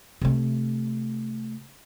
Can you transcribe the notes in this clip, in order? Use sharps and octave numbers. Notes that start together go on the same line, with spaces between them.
C3 A3